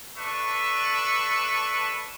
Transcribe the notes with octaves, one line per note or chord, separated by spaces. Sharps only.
D4 A4 B4 E5 C#6